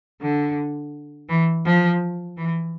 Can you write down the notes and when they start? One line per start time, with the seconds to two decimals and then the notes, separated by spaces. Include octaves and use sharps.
0.21 D3
1.29 E3
1.65 F3
2.37 E3